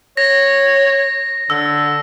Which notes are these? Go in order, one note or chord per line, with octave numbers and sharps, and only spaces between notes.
C#5 A#6
D3 E6